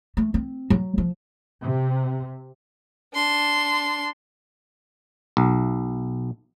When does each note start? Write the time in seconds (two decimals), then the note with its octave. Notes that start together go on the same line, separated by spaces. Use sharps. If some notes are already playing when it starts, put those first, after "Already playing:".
0.17 A3
0.34 C4
0.70 F#3
0.98 F3
1.63 C3
3.14 D4 C6
5.37 B1